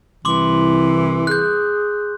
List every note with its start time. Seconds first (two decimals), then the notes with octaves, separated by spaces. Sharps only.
0.25 C2 E3 C6 D6 F#7
1.27 G#4 F#6 G6